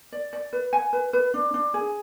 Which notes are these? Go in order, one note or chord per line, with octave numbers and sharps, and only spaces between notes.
D5
D5
B4
G#5
B4
B4
D4
D4
G#4